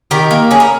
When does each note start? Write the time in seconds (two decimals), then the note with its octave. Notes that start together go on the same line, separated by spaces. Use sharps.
0.11 D#3 G4 A#4
0.31 A#3
0.51 C#4 G#4
0.60 A#4